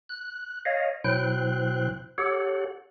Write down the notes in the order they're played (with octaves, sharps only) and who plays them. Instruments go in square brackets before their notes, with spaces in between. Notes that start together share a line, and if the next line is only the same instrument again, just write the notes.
[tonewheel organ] F#6
C#5 D#5 F5
B2 F#3 E4 C5 G5 F#6
G4 A4 C#5 F#5